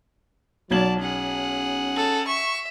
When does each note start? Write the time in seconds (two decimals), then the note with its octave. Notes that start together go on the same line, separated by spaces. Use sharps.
0.71 B1 F#3 D5 A5 G#6 F#7
1.01 C#4 G#4 F#5
1.97 A4
2.28 E5 C#6